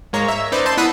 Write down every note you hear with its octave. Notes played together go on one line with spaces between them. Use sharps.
G#2 G#3 A#3 C#5 A#5
E5
C#4 D#4 B4 C5 D5
A5 C6 G6
B3 E4 E5 F#5 B5 D#6